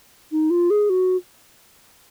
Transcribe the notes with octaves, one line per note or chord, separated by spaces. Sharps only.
D#4
F4
G#4
F#4